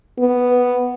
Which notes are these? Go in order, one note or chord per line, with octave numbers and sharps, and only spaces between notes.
B3